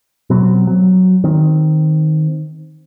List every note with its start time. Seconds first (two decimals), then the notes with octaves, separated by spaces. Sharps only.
0.30 B2 F#3 C4
0.67 F#3
1.24 D#3 C4